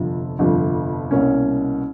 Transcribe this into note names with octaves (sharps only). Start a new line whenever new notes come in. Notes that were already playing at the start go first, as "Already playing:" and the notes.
Already playing: G1 F2 C3 F3
G1 F2 C3 F3
C2 B2 G3 A#3 C#4